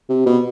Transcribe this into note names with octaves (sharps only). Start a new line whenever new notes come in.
C3
B2